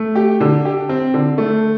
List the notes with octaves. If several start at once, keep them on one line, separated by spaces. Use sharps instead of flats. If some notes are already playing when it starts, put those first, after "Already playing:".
Already playing: A3
G4
D3
G4
C4
D3
A3